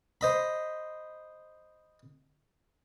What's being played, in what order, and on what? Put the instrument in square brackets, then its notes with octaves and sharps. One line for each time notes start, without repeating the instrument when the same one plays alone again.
[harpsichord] C5 D#5 B5